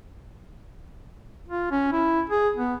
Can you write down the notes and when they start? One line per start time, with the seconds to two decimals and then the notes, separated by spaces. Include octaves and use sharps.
1.49 F4
1.71 C#4
1.92 E4
2.30 G#4
2.57 B3